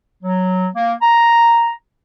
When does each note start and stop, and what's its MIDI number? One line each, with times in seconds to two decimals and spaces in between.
0.24 0.68 54
0.75 0.94 58
1.02 1.71 82